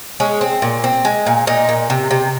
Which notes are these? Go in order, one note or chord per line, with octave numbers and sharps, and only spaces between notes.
G#3 C#4
C4
A#2
C4
G#3
A#2
A#2 D#4
A#2
C3
C3